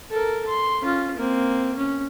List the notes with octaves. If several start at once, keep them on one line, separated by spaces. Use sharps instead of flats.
A4 A#4
C6
C#4 F4
A#3 C4
C#4